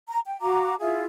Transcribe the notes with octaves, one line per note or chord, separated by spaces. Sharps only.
A#5
G5
F#4 F5 A#5 D6
E4 F4 G#4 F5